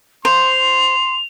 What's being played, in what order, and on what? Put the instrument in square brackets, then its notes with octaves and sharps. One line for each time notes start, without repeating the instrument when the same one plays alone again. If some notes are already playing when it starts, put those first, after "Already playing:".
[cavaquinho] C5 [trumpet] C6 [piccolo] F7